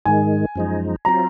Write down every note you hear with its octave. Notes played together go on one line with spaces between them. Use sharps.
G#2 D#3 G#3 G#5
F#2 F3 G#3 D#4
F#3 C4 F4 A#5